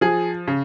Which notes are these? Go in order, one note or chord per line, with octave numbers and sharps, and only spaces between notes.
F3 G#4
C#3